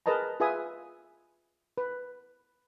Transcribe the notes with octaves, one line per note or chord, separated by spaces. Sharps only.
G#4 A#4 B4 D#5 A5 A#5
F4 G#4 B4 E5 G#5 D#6
B4